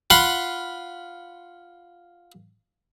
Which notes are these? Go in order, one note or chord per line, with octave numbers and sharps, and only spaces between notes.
F4 F#5 B5 C6